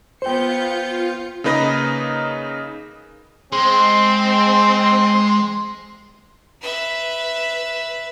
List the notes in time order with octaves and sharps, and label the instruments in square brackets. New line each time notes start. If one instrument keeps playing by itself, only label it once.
[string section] B3 G6 C#7 [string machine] F4 [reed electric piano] C5 G5
[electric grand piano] C#3 A#3 D#4 B4 D#5 A#6
[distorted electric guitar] G#3 [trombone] C4 [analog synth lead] C6
[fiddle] B4 E5